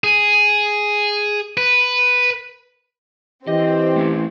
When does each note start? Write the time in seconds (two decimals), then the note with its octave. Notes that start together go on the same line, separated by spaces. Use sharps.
0.04 G#4
1.57 B4
3.47 E3 C4 G4 D#5
3.96 A3 C#4